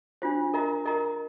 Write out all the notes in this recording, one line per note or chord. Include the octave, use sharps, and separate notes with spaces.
D4 F4 C5
A#4 D#5 A#5
A#4 D#5 A#5